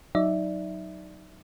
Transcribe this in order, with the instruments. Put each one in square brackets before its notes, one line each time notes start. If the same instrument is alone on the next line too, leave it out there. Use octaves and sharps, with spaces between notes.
[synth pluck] F#3 D#4 D5 E5